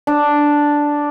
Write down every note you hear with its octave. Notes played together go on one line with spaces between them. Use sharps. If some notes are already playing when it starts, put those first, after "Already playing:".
D4